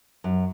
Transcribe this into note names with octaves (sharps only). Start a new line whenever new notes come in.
F#2